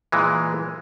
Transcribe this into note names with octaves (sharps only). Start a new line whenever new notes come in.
A#2 E3 G#3